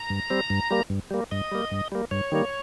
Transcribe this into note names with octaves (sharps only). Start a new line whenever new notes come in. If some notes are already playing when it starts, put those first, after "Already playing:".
Already playing: A#5
G2
G3 C4
G2
G3 A#3
G2
G3 A#3
G2 D#5
G3 A#3
G2
G3 A#3
G2 C#5
D#3 G3 A#3